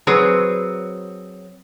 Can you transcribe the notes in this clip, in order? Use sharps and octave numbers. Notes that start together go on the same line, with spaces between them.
F#3 C4 G#4 B4 C#5 A#5